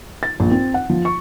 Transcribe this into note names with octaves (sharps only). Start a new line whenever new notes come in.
A6
A#1
C4
F#5
F3
C#6